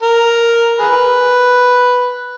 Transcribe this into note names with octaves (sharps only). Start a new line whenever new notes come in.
A#4
G#4 B4